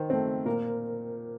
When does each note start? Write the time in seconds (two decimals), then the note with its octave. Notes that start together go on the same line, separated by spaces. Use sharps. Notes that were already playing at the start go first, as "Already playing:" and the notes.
Already playing: D#3 C5
0.10 A3 C4
0.45 A#2 A#4